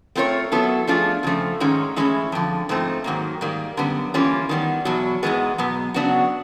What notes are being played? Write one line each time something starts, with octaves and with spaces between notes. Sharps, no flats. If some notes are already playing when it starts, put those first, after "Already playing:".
A3 C4 F4 A#4 C#5
F#3 B3 E4 A4
F3 A3 D4 F4 G#4
F2 C#3 F3 A3
G#2 D#3 G#3 C#4
A2 E3 G#3 C#4 E4
F2 D3 F3
G#2 F3 A3 C4 D#4
G#2 D#3 F#3 A#3
G#2 D#3 G3 A#3
F#2 D3 G3 B3
E3 G3 A#3 C#4 F4
D#3 G3 B3
E2 B2 F#3
G#2 E3 G#3 B3
B2 F#3 B3
C#3 F#3 B3 D4 F#4